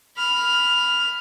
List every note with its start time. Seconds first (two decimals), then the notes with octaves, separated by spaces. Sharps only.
0.17 B5 F6